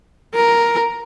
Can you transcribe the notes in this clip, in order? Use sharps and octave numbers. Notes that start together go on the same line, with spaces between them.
A#4